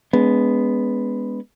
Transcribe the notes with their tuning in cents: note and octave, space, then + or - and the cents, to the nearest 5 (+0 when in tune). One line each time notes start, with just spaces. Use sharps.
G#3 +0 B3 +0 D4 -45